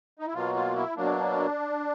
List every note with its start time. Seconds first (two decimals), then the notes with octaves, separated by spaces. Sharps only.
0.19 D#4
0.27 E4
0.34 B2 F#3 A#3 F4
0.55 F4
0.76 E4
0.97 B2 F#3 A#3 D4